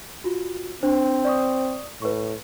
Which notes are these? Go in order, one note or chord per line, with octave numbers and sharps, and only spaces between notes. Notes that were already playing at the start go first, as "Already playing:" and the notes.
F4 F#4
C4 D4 C5
D5 C#6 D#6
A2 B4 C#6